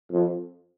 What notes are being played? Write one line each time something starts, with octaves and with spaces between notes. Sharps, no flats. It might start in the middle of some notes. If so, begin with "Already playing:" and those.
F2